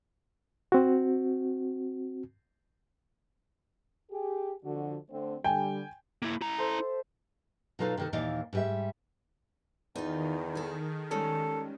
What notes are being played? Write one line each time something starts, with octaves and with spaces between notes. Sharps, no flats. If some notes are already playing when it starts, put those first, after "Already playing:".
C4 F#4
G4 G#4
F2 D3 F#4
D3 A3 C4
D3 G3 G5 G#5
A#3 E4
E4 A#5
A4 C5 E5
B2 F#3 D#4 F4 A4 F5
C3 D#3 A4
D#2 A#2 E3 D#4 D5 F5
G#2 G3 E5
E2 D#3 D#4 F4
G#4 A4
G3 G#3 C#4 A4